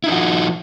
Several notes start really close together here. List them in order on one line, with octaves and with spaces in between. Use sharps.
E4 D#4 F3 F#4